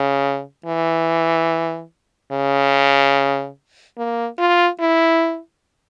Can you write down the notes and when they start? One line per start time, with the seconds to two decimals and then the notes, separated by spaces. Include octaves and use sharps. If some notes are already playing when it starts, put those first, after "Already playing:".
Already playing: C#3
0.66 E3
2.32 C#3
3.98 A#3
4.39 F4
4.80 E4